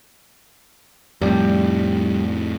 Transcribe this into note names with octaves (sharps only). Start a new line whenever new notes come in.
F2 A2 G3